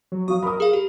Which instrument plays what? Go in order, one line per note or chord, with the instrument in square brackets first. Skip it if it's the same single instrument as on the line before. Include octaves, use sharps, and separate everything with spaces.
[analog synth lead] F#3
[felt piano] F#3 F5 [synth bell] C#6 [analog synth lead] D#6
[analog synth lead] A#4 [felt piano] B5 D#6
[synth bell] G#4 F5
G4